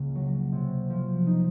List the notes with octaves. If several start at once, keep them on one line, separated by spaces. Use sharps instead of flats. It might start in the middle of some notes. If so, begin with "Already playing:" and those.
Already playing: C#2 C#3 A#3
F#3
C3
F3
D#4